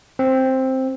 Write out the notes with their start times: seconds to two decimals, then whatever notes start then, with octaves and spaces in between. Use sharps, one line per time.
0.19 C4